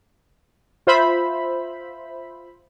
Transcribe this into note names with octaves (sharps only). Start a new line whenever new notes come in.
F4 C5 E5 B5